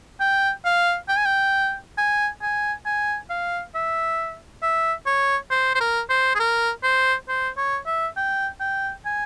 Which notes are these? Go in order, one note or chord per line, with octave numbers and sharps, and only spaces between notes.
G5
F5
G5
G#5
G5
G#5
G#5
G#5
F5
E5
E5
C#5
C5
C5
A#4
C5
G#4
A#4
C5
C5
C#5
E5
G5
G5
G#5